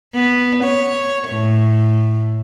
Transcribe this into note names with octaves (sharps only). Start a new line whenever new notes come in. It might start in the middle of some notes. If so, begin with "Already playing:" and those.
B3
C#5
A2